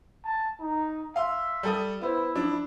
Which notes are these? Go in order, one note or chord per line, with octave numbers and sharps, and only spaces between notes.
A5
D#4
E5 F5 C6
G3 A4 D#6
B3 E4 C5
F3 D4